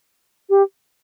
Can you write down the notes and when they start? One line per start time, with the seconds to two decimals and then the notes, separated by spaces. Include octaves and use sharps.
0.50 G4